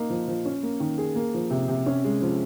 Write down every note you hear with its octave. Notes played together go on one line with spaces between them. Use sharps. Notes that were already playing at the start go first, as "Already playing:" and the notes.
Already playing: A#3 D#4
F3
F3
C#4
A#3
D#3
G#4
A#3
F3
C3
C3
C#4
G#3
F3